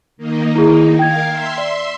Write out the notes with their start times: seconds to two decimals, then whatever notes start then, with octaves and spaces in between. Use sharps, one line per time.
0.17 D#3 A#3 D#4
0.55 E4 G#4
0.99 A#4 F5 G5 G#6
1.28 E5 C6
1.58 D5